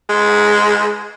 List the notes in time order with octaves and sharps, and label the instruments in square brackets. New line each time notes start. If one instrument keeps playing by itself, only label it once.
[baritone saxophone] G#3